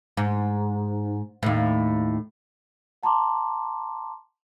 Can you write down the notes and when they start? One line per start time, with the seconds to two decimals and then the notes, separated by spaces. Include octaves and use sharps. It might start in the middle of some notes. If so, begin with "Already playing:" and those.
0.17 G#2
1.43 D#2 A2
3.03 F#5 A5 A#5 C6 D6